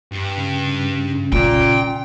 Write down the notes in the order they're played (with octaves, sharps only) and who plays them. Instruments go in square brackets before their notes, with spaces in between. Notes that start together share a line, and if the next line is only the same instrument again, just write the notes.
[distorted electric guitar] G2
[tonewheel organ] C#3
[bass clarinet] A#2 [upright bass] C#4 [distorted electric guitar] G5